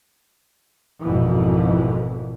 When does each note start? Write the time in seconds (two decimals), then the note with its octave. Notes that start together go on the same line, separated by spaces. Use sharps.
1.00 G#1 F2 B2 E3